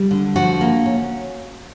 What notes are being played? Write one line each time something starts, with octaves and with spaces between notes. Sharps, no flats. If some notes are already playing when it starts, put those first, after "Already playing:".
Already playing: G3
D3
F3 F#4
A#3
C#4